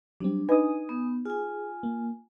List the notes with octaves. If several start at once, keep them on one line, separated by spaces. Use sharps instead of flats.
F#3 G3 C4 D4
D#4 B4 D#5 G#5 D#6
B3
F4 G#4 G#5
A#3